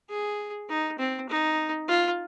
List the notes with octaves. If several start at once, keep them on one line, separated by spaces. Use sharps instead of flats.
G#4
D#4
C4
D#4
F4